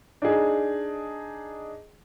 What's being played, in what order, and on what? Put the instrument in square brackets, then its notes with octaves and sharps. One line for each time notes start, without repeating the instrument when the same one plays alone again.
[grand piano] D4 D#4 G#4